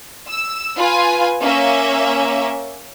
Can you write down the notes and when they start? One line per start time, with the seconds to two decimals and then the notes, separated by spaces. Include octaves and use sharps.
0.29 E6
0.77 F4 B4 G#5
1.42 A#3 C#4 E5